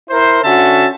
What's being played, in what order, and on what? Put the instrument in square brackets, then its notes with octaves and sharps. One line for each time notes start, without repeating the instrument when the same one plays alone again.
[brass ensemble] E4 A#4 C5
D3 C#4 F#4 E5 A5